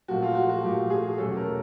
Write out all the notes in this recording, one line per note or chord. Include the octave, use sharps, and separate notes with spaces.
A#2 F3 A3 F#4
F4
F#4
F#4
A#2 F3 A3 G4
G#4
E2 B2 F#3 A3 C#4 A4
A#4